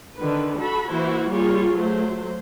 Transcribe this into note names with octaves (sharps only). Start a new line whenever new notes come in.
D3 D#3 B4
F#4 A4 B5
E3 A#3 E4 F#4 C5
G3 A#3 F4 G#4 C#5
F#3 A3 C5